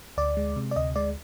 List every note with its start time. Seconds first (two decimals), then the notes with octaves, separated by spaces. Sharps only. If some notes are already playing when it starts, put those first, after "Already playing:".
0.17 D2 D5
0.37 G#3
0.56 C3
0.71 D5
0.76 D2 D#5
0.96 G#3 D5